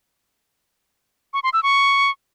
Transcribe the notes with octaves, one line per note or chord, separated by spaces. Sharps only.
C#6
C6
E6
C#6